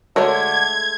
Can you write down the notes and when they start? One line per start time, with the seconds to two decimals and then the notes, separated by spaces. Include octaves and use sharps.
0.16 D3 G#3 A3 F#4 A#4 C#5 G#6